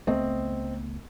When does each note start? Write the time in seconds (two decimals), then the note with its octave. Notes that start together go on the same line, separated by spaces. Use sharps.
0.07 C#2 A3 B3 C4 D#5